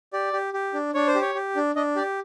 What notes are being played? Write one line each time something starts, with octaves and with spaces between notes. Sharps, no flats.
G4 D5
G4
G4
D4
D4 C#5
C5
G4
C#5
G4
D4
D4 D#5
G4 D5